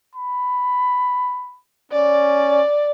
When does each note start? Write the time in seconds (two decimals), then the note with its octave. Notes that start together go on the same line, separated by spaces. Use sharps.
0.15 B5
1.92 C#4 D5